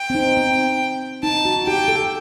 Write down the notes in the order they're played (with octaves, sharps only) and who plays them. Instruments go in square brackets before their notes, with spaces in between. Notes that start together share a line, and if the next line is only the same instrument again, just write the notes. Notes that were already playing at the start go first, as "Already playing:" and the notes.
Already playing: [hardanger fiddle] G5
[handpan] C4
D#4
C4
[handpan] D#4 [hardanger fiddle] A5
[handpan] F#4
[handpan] G4 [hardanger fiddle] G5
[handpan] A4